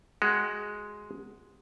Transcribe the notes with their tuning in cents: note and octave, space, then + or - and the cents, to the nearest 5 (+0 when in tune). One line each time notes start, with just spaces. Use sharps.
G#3 +5 F#4 +15